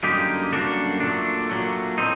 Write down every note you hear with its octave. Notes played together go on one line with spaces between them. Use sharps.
F#2 D3 G3 A#3 D#4 G4
F#2 D3 G3 A#3 D4 F#4
A#2 F#3 A3 D4
A#2 F#3 A3
A2 A3 C4 D#4